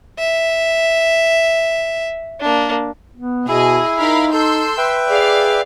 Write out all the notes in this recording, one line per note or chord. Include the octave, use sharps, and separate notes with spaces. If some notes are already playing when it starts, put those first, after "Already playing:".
E5
A#3 D4
B3
B2 E4 G#4 D#5
D#4 A#4 F5 B5
A4 C6 E6 G6
B4 E5 G5
G#4 D5 F5